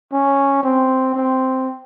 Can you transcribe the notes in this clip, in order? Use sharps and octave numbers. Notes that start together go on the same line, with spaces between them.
C#4
C4
C4